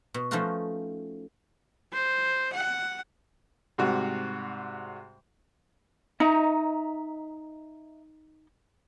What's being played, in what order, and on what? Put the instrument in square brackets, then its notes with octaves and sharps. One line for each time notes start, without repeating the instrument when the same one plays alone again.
[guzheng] B2
F3 A3 C#4 D#4 F4 F#4
[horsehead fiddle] C5
F#5
[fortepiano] G#2 C3 G3 F#4
[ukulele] D#4 [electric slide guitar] D#5 E5 A#5